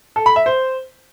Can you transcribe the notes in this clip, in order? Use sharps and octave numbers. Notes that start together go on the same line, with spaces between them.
A4
B5
E5
C5